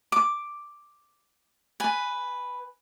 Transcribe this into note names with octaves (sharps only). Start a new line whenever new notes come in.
D6
B4 G#5